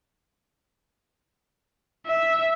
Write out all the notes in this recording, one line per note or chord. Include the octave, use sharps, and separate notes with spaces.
E5